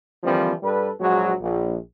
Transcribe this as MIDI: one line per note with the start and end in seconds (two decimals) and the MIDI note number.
0.23 0.52 50
0.23 0.52 52
0.23 0.52 53
0.23 0.52 55
0.23 0.52 58
0.23 0.52 60
0.63 0.89 43
0.63 0.89 55
0.63 0.89 69
0.63 0.89 71
1.00 1.33 34
1.00 1.33 54
1.00 1.33 56
1.00 1.33 66
1.41 1.77 34